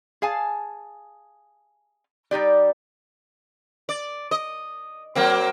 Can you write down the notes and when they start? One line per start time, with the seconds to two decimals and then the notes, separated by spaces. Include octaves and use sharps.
0.22 G#4 F5 G#5 A5
2.31 G3 D#4 G4 D5
3.89 D5
4.31 D#5
5.15 F#3 A#3 C4